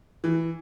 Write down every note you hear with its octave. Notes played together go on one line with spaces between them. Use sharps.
E3